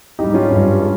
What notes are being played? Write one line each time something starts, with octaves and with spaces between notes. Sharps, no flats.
G#2 G3 D#4 G4
C#4 F4
G2 G3
G#3